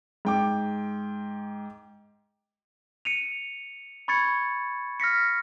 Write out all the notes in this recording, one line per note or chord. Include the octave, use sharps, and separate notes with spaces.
G#2 G5 D6
C#7 D#7 F7
B5 C#6 G#6 A6 C#7
F6 A#6 B6 C#7